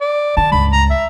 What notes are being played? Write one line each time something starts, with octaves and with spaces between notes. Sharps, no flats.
D5
D#3 C4 A5
C#2 G2 B5
A#5
E5